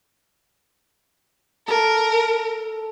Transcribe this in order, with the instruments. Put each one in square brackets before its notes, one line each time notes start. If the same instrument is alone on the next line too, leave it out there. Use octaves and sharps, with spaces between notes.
[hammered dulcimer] A4 [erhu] A#4